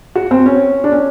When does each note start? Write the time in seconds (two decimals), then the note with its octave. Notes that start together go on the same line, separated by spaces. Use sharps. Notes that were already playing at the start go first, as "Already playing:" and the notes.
0.15 F#4
0.31 C4
0.46 C#4
0.84 D4
0.92 C#4